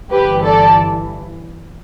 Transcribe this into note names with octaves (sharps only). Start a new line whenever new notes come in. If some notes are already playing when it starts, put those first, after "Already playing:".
G1 G2 E3 G4 B4
A4 D5